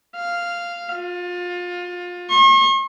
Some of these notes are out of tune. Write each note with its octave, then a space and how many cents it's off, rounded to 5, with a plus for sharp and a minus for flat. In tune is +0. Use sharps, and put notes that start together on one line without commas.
F5 -10
F4 +25
C#6 -45